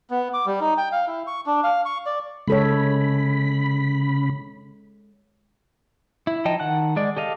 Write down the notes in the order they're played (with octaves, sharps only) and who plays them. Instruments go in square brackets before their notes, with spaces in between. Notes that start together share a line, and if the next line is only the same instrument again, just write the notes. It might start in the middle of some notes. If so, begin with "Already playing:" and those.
[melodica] B3
D6
G3
D#4
G5
F5
E4
C#6
D4
F5
C#6
D5
[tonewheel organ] C#3 B5 [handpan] G#3 A4 C#5
[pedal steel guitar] E4
F3 D#4 D#5 G5 A5
D#3 F#5 A5 F#6
G#3 D5
G4 A4 D#5 F5